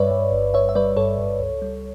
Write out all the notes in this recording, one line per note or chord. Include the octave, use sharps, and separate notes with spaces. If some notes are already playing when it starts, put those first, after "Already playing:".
Already playing: G2 G3 B4 C#5 D5 E5
G2
G1
G1 C#5 E5
E5
G3 B4 D5
G2 A4 C#5
G2
C#2
G3